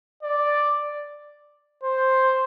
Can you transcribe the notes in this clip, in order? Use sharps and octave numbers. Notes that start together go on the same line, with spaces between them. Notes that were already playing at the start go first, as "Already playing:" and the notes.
D5
C5